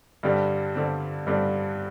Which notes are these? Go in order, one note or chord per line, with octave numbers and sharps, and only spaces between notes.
G2 D3 G3 C4
G2 D3 G3 C4
G2 D3 G3 C4